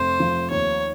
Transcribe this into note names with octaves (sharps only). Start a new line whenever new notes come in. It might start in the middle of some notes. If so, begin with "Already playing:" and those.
Already playing: F1 C5
F3
D#2 C#5